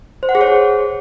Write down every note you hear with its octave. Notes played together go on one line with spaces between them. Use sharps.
C5
F#5
G#4
C#5
G#4